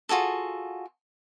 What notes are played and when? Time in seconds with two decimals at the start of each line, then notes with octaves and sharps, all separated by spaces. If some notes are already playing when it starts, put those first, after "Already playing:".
0.09 F4 F#4 G#4 A4